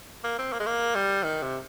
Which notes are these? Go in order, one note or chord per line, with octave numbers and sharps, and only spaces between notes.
A#3
C4
A#3
G#3
A#3
G3
D#3
C3